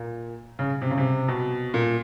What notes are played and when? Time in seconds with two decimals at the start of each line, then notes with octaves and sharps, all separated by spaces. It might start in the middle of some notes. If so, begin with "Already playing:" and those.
Already playing: A#2
0.59 C#3
0.82 C3
0.91 C#3
0.98 C3
1.28 B2
1.74 A#2